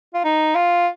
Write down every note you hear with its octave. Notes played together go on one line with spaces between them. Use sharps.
F4
D#4
F4